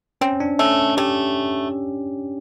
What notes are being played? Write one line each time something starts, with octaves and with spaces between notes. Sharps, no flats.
C4 C#4
D4
A3 C#4
A3 G4